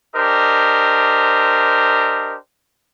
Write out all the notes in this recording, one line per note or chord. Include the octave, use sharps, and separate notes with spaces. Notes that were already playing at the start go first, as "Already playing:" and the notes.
D4 G4 A#4 C5 D#5